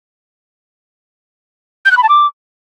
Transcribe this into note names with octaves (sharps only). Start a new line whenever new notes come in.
G6
F#6
B5
A5
D6